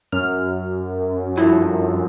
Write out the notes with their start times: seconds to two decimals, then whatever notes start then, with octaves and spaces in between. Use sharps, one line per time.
0.12 F#2 F6
1.38 G2 F3 F#3 E4